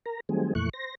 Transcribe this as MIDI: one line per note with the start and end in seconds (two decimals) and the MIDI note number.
0.06 0.20 70
0.06 0.20 82
0.29 0.53 51
0.29 0.53 54
0.29 0.53 55
0.29 0.53 57
0.29 0.53 60
0.29 0.53 68
0.55 0.69 41
0.55 0.69 46
0.55 0.69 52
0.55 0.69 57
0.55 0.69 85
0.55 0.69 90
0.73 0.95 72
0.73 0.95 94